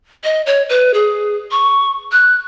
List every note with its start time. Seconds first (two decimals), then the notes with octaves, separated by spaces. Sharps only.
0.24 D#5
0.46 C#5
0.69 B4
0.94 G#4
1.51 C#6
2.12 F#6